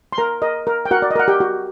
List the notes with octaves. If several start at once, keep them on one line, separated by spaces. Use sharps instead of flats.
C6
A#4 A#5
A#4 D#5
A#4
G5
F#4 A#4 F#5
D5
D#5
A#4 F#5
G4 G5
F#4